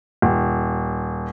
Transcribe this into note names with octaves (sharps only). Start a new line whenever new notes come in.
D#1